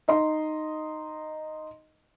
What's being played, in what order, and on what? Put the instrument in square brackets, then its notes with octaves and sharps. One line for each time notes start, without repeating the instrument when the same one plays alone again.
[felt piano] D#4 D#5 C6